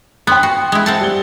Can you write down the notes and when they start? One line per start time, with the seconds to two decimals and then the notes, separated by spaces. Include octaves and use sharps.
0.27 B3 G5 C6 F#6
0.43 F#4
0.72 G#3 E4
0.86 C4 F#5 A5
1.01 G3 G7